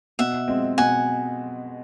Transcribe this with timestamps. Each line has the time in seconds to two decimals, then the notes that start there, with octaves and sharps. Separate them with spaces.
0.19 B2 E5 F#5
0.48 G#3 C4
0.78 B2 F#5 G#5